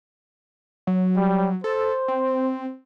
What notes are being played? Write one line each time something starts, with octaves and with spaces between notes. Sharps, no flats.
F#3
G3
A4 C5
C4